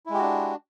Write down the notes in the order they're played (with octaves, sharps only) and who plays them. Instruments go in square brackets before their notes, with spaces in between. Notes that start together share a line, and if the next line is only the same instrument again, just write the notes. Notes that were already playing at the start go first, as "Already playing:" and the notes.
[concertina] E4
G#3
G4
F#4
D4